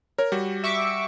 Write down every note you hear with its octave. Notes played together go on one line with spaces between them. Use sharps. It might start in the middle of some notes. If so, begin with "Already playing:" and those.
A#4 C#5
G3 F#4
E5 C#6 D6